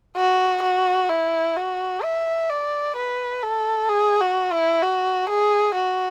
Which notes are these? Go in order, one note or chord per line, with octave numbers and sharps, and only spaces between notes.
F#4
F#4
E4
F#4
E5
D5
B4
A4
G#4
F#4
E4
F#4
G#4
F#4